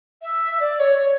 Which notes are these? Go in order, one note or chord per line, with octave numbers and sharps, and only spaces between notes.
E5
D5
C#5
C#5